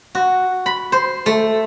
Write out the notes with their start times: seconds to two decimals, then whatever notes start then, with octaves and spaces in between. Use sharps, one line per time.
0.15 F#4
0.66 B5
0.92 C5
1.26 A3